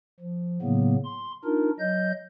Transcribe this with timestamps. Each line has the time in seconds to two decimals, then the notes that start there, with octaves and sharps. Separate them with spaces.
0.20 F3
0.62 A2 C#3 F#3 A#3 B3
1.05 C6
1.44 D4 D#4 F4 A#4
1.79 F#3 D#5 G6